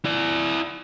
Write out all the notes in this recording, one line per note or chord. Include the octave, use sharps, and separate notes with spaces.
E4 D5